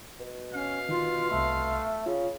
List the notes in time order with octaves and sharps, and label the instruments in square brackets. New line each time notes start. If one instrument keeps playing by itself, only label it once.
[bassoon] B2
[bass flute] C#4 [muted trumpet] F5
[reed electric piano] D#3 [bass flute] F4
[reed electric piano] C2 E5 C6 [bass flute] A3
[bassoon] C#3 [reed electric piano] F4